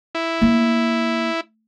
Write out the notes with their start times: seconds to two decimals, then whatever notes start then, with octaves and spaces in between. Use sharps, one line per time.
0.15 E4
0.42 A#3